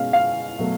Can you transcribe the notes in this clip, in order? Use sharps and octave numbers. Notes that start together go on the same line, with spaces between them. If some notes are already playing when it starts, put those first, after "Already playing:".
Already playing: B2 G#3 C#4 F5
F5
B2 F#3 A3